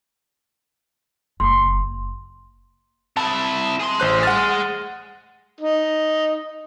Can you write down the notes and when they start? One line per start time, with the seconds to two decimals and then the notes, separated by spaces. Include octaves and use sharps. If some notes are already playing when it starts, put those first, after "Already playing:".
1.40 F#1 C6
3.17 C3 E4 A5
3.80 G#4 C6
4.00 A1 C5 F#6
4.23 F#5 F6 A6
5.60 D#4